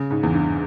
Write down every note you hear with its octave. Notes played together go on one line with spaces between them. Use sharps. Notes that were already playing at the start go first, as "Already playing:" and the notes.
Already playing: C#3
G#2
E2
G2